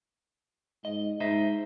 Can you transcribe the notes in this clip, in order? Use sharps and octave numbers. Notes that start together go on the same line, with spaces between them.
G#2 D#5
G#2 D#4 C5 E5